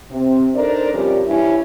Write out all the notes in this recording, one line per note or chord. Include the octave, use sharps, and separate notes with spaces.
C3 C4
D4 D#4 A4 A#4 C5 D5
G2 C3 F3 G3 C#4 G4
G2 E3 C#4 E4